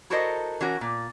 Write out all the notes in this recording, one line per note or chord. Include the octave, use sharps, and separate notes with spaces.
E4 F#4 A4 A#4 C5 D#5
E3 C#4 F#4 A#4
A#2